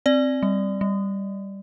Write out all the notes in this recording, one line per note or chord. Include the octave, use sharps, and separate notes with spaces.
C4 D5
G3
G3